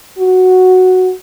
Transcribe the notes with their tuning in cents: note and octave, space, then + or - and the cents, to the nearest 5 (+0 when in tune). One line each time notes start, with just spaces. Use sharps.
F#4 +0